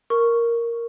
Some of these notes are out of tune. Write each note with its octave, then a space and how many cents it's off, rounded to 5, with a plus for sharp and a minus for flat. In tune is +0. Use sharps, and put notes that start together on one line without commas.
A#4 +0 C#6 +0